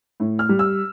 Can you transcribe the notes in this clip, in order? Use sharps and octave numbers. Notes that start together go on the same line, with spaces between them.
A2
F6
G3
E6